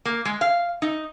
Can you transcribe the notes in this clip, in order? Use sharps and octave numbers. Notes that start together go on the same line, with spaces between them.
A#3
G#3
F5
D#4